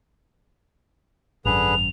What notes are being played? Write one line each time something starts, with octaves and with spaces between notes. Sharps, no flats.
G#1 F#2 D3 G#4 B4 F7